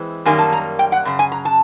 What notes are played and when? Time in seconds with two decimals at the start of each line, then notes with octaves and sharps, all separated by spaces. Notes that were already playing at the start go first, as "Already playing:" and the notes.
Already playing: E3 G#3 C4
0.25 F#2 D#3 G3 A#3 G#5
0.39 A5
0.53 A#5
0.79 G5
0.92 F#5
1.05 F#2 C#3
1.19 G#5
1.32 A#5
1.45 A5